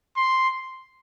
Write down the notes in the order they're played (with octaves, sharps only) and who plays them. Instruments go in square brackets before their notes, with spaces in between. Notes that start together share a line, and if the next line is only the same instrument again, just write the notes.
[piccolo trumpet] C6